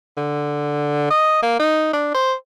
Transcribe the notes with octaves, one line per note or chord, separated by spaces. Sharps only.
D3
D#5
A#3
D#4
D4
C5